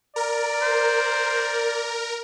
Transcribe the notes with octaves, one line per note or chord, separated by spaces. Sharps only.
A#4 D5
C5